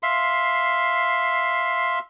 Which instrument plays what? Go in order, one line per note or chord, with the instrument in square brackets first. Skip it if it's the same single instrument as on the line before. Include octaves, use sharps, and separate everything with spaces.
[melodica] E5 F5 C6